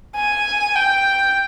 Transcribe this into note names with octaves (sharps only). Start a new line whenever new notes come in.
G#5
G5